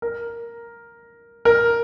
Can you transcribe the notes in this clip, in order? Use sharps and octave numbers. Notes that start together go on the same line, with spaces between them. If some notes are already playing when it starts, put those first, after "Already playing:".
A#4
A#4